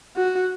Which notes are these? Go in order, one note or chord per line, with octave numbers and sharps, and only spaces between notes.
F#4